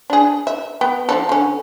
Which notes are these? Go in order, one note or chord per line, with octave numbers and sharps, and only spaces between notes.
D4 G#4
E5
B3 G5
F3 D#4 A4
D3 C#4